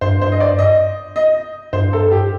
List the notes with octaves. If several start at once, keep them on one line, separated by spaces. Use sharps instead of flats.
G2 C5
C5
D#5
D5
D#5
D#5
G2 C5
A4
G4